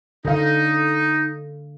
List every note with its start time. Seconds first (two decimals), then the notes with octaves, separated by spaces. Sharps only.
0.25 D3 D#4 F5